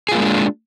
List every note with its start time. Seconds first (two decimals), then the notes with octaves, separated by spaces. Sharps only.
0.09 G#4
0.12 F4
0.15 A#3
0.18 G#3
0.21 D4